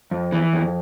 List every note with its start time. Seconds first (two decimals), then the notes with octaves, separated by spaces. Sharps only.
0.11 F2
0.32 E3
0.53 F2